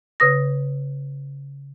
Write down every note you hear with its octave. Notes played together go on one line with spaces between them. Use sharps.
C#3 B4 D#6 A#6